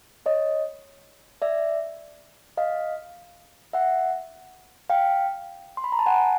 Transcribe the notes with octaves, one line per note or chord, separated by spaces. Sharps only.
C#5 D#5
D5 E5
D#5 F5
E5 F#5
F5 G5
C6
B5
A#5
A5
F#5 G#5